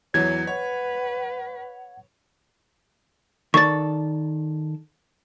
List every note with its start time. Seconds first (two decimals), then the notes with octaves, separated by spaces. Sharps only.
0.14 E2 E3 F#3 C#5 G#6
0.47 B4 C#5 F#5
3.54 D#3 A4 D5 C#6 A6